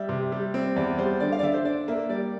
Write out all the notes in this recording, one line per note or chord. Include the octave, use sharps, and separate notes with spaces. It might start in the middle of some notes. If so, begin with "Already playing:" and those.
Already playing: G3 E5
C3
G3
C4
E2 D5
G3 C5
D3 D5
F5
D5
D3 E5
C5
D4 D5
A#3 E5
G3 D5